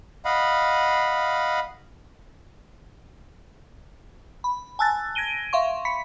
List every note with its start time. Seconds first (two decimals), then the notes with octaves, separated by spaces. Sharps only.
0.25 D#5 F5 F#5 B5
4.44 B5
4.79 G#5 A5 E6 F#6 A6
5.15 G#6 A#6 D7 D#7 G7
5.53 E5 F5 C6 C#6
5.85 B5 B6 C#7